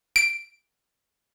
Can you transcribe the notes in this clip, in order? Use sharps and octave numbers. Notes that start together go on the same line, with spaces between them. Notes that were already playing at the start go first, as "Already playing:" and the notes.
D7